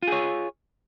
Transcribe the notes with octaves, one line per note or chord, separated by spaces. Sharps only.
F4 G#4 C#5